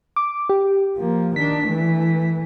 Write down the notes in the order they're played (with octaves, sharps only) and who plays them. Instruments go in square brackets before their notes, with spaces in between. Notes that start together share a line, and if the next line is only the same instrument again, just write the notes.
[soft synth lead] D6
G4
[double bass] F3 A#3
[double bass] D#3 D4 [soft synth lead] B6
[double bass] E3 A3